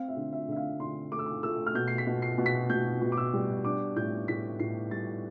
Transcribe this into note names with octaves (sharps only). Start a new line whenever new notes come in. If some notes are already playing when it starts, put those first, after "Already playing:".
Already playing: C4 F5
E5
D3
E5
D3 E5
F5
D3 C6
A3 D6
E6
D6
A3 E6
F6
B2 G6
C7
B6
B2
C7
B2
B6
B2 G6
B2
D6
E6
G3
D4 D6
A2 G6
A2 B6
A2 C7
G3 A6